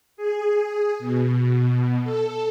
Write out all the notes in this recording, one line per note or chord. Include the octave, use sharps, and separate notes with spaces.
G#4
B2
A4